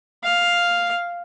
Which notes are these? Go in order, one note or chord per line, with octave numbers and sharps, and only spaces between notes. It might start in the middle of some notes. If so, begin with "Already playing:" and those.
F5